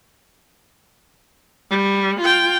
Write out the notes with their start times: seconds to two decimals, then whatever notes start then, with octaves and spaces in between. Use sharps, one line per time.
1.71 G3
2.20 F4 G5